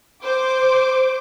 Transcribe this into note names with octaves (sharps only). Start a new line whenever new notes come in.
C5 D6